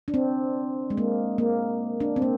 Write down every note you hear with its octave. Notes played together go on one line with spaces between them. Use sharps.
D4
C4
G#3
A#3
A#3
D4
C4
A#3